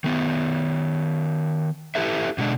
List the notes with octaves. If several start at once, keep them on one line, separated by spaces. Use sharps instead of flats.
D#3 B3
E4 G4 A4 B4 E5
B2 D3 G#3 D4